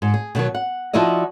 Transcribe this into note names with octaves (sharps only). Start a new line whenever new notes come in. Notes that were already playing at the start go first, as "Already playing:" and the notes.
G#2
G#4
B2 D3 D#3 F#3
F#5
F3 D#4 E4 F#4 D5 D#5